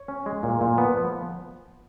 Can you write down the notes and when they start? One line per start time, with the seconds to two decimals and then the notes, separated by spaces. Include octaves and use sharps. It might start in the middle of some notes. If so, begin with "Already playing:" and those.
Already playing: C#5
0.08 C#4
0.26 G#3
0.43 A#2
0.61 A#2
0.78 B3
0.95 F3